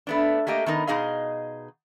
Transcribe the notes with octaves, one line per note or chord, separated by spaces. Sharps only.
A3 B3 D4
A3 A#3 G4 D#5
D#3 B3 D#4 A#4
B2 D#4 G#4 D#5 F5